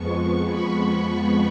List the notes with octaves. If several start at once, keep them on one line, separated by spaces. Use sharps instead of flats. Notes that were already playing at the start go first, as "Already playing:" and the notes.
Already playing: F2 F3 G#3 B3 C#6
C#6
B5
B5